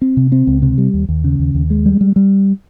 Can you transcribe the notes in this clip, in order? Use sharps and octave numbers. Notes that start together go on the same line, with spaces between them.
C4
C3
C4
C#2
C3
G3
D#2
D#2
C#3
D#2
D#2
G#3
G3
G3
G3